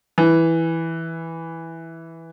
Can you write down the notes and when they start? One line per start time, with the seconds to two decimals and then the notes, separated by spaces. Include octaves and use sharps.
0.18 E3